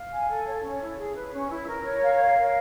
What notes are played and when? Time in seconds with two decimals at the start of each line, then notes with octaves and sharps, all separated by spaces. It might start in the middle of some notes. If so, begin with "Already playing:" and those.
Already playing: F5
0.11 G#5
0.28 A4
0.46 C#5
0.63 C#4
0.80 E4
0.98 G#4
1.14 B4
1.33 C#4
1.50 E4
1.67 A#4
1.85 C#5
2.02 F5
2.19 A#4
2.37 A#4